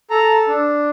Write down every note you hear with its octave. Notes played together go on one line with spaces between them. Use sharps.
A4 A#5
D4